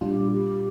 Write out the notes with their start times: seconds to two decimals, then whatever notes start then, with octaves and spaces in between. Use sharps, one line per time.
0.01 A#2 G3 D4 F4 G4
0.31 G4